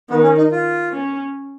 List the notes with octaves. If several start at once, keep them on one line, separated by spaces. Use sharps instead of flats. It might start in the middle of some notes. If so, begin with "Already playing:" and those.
D#3 B3
C#4
D#4
F4
C#4